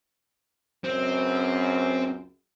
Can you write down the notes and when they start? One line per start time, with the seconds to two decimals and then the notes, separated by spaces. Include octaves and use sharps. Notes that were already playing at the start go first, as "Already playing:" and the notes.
0.84 C#2 F#2 C4